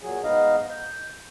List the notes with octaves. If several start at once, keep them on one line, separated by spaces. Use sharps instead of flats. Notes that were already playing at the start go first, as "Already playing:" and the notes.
A#2 F#3 G#4
G#2 B3 D#4 D#5 F5
G6